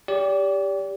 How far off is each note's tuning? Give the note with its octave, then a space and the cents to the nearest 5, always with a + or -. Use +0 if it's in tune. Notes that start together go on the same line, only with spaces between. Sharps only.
G4 +15 D5 -35